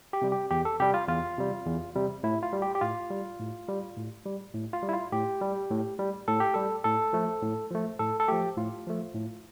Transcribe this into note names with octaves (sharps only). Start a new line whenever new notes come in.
G4
C3 G3
G4
E2 G4
A4
C3 G3 G4
F4
E2 F4
C3 G3
E2
C3 G3
A2 E4
F4
G3
G4
G4
A2 F4
G3
A2
G3
A2
G3
A2
F4
G3
E4
F4
A2 G4
G3
A2
G3
A2 A4
G4
G3 A4
A2 A4
F3 A3
A2
F3 A3
A2 A4
A4
F3 A3 G4
A2 F4
F3 A3
A2